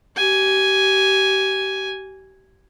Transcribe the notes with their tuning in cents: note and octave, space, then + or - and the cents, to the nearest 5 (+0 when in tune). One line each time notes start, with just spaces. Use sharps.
G4 -30 G#5 +0